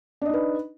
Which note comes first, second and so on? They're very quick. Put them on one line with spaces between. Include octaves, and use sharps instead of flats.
D4 D#5 D#4 B4